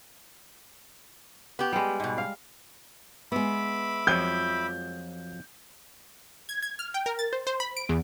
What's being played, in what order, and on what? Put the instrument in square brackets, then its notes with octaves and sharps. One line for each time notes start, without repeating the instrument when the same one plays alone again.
[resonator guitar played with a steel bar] B3 G4
[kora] G3 G#3
[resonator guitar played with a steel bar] G#2 B2
[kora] F5
[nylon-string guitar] G#3 B3 [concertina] E5 B5 D6
[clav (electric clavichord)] F2 F3 F#3 [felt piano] G6
[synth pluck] G#6
G#6
F6
G5
A#4
A6
C5
C5
B5
D7
E2